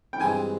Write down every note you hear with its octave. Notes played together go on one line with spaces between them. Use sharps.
G5
G2 E3 G#3 C4 F4 G#5